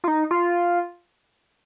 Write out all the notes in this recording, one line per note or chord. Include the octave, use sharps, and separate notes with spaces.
F4
D#4
F4